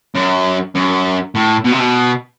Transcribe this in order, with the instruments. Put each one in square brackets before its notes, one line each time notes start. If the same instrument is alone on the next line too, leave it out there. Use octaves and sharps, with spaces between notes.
[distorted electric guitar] F#2
F#2
A2
B2
C3
B2